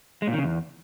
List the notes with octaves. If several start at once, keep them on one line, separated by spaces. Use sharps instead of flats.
G#3
A#2
D#3
C#3
E2